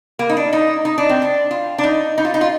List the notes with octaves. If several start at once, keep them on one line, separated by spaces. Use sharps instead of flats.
A#3
D#4
D4
D#4
D#4
D4
C4
D4
F4
D4
D#4
D#4
F4
D#4
F4